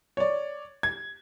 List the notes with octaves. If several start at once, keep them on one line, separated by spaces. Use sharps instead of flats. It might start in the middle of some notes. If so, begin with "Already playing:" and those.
C#5 D5
G#6